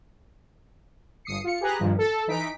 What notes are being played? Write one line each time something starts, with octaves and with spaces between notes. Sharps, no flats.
G1 D#6 C7 C#7
F4 C#7
G4 G#4 B4 A#5 F#6
G2 A#2 D#3 F3
A4
E3 D#4 B6 D7